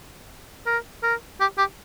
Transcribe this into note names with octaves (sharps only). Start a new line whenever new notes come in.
A#4
A#4
G4
G4